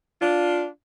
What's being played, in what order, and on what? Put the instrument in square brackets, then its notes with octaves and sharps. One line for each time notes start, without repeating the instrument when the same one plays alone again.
[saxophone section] D4 F4